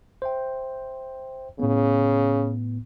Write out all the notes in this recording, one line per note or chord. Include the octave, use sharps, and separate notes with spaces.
C5 E5 G5
A2 C#3 B3